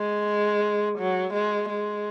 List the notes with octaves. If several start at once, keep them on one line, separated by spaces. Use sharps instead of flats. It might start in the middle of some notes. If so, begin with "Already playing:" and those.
Already playing: G#3
F#3
G#3
G#3